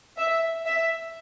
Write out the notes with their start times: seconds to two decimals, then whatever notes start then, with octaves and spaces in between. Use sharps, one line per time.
0.17 E5
0.65 E5